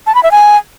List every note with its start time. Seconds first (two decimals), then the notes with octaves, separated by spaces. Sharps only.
0.07 A5
0.15 B5
0.23 E5
0.32 G#5